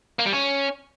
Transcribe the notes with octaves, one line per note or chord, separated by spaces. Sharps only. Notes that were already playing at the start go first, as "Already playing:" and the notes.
A#3
G3
C#4